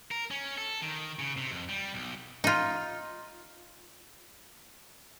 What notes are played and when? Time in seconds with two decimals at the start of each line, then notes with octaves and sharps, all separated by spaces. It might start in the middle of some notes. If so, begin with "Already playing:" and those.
0.11 A#4
0.31 C#4
0.58 A4
0.82 D#3
1.19 C#3
1.37 C3
1.51 F2
1.69 G3
1.94 B1
2.44 D#4 F4